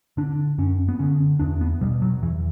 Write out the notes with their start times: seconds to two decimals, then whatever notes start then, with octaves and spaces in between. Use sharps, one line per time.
0.17 D3 D4
0.58 F#2 C#4
0.89 B3
0.99 D3 C#4
1.40 E2 D4
1.61 B3
1.81 B2 G3
2.02 F#3
2.22 E2 E3